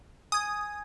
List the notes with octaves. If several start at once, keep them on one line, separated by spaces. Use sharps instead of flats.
G#5 D#6 G#6